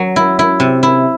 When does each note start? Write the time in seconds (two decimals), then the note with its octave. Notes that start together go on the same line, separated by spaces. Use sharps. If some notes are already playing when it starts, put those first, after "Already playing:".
Already playing: F#3
0.16 E4
0.39 E4
0.60 C3
0.83 E4